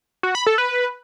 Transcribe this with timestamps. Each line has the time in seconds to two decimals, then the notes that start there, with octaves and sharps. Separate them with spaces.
0.23 F#4
0.35 B5
0.46 A4
0.58 B4